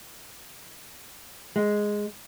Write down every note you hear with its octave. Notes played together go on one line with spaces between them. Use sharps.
G#3